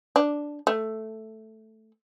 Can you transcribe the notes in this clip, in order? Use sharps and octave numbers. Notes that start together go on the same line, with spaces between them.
D4
A3